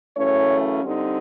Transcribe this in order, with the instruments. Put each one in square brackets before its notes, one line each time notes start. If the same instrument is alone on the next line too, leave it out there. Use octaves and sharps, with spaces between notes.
[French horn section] F#2 C#3 E3 A3 C#4 C#5
D3 G3 C4 D#4